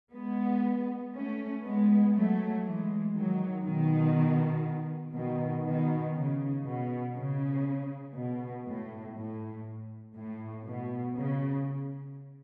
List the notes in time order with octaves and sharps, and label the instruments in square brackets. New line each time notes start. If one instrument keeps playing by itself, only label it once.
[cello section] G#3 B3
A3 C#4
G#3 B3
F#3 A3
E3 G#3
D#3 F#3
B2 D#3
B2 D#3
B2 D#3
C#3
B2
C#3
B2
A2
A2
A2
B2
C#3